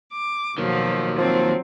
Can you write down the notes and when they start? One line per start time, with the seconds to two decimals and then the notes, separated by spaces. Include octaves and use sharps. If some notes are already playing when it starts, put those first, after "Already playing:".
0.13 D6
0.58 B2 D#3 F3 F#3 A#3
1.18 F3 F#3 C4